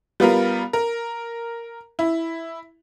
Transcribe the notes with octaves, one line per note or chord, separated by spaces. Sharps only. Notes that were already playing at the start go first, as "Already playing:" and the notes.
G3 B3 F4 A#4
A#4
E4